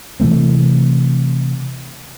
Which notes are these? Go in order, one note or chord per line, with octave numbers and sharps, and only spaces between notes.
C3 E3 A3 C4